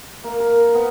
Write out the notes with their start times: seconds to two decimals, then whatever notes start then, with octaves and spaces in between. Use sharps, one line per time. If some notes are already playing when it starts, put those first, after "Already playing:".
0.24 A#3
0.40 A#4
0.74 B3